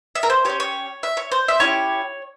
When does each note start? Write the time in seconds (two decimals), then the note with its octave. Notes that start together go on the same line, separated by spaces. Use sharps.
0.15 E5
0.23 A#4
0.30 C5
0.45 C#4 G4 C#5
0.60 C#5
1.03 E5
1.17 C#5
1.32 C5
1.48 E5
1.60 C#4 E4 G4 C#5